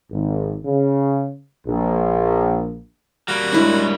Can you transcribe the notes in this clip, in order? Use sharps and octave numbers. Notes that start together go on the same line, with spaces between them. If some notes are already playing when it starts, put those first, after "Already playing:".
G#1
C#3
A#1
G3 A#3 F#4
F#2 G#3 D4 E4